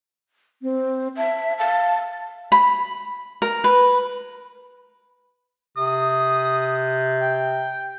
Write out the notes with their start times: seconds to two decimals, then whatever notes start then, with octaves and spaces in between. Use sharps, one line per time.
0.62 C4
1.17 E5 A5
1.59 F5 A5
2.52 B5
3.42 A#4
3.64 B4
5.77 C3 D#6
7.21 G5